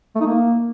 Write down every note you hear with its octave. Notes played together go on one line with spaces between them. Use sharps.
A3
D#4
A#3